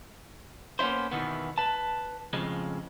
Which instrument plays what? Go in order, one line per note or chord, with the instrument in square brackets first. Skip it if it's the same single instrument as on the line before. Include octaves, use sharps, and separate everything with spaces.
[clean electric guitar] A#3 B3 C#4 E4 C5
E2 B2 D#3 E3 B3
B4 A5
F2 A2 C#3 F3 G#3